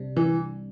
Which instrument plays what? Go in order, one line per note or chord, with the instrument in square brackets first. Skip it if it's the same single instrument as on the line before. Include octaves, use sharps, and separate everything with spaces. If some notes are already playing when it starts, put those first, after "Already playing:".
Already playing: [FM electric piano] C2 C3 G3 D4
[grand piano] E3